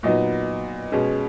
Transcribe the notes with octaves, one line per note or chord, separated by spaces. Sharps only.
A#2 F#3 B3 D#4 D#5
B2 G#3 C#4